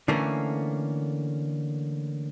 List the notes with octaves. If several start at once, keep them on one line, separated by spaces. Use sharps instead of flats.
D3 E3 A3 A#3 C#4